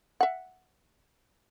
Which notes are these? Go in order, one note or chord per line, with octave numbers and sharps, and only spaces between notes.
E5 F#5